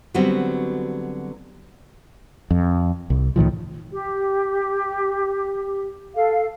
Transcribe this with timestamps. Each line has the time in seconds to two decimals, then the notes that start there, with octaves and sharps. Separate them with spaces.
0.14 D3 F#3 G3 B3 C4 F#4
2.51 F2
3.10 C2
3.36 C#2 A2 D#3 F3
3.92 G4
6.15 A4 F5